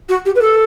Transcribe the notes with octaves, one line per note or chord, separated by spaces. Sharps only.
F#4
G4
B4
A4